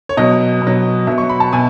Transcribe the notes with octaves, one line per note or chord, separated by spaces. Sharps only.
C#5
B2 F#3 D#5
B2
F#3
B2 F#3 E5
C#6
B5
A5
B2 G#5